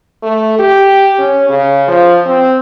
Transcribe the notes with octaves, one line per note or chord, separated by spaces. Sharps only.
A3
G4
C#4
C#3
F3
C4